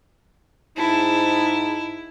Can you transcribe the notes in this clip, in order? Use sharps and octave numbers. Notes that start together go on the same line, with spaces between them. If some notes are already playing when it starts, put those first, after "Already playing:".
G#2 D#4 E4 A5